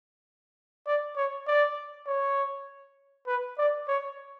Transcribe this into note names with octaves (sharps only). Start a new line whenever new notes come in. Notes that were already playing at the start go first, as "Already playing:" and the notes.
D5
C#5
D5
C#5
B4
D5
C#5